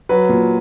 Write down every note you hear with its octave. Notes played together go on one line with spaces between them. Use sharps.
F#3 B4
A#2